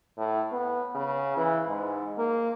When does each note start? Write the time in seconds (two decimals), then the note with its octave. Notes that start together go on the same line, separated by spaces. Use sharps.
0.17 A2
0.52 B3
0.95 C#3
1.37 E3
1.68 G#2
2.18 A#3